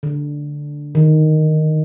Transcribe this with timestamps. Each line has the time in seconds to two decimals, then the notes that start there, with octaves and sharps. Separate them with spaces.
0.03 D3
0.95 D#3